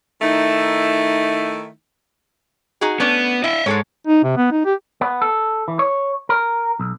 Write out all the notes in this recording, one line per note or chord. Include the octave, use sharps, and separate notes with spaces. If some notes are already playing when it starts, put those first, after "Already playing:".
D#3 A3 D#4 E4
D#4 F#4 G#4
A3 B3 C#4 D4
E4 D#5 E5
G#2 G#3 A4 C#5
D#4
C3
B3
D#4
G4
B3
A4
E3
C#5
A#4
B1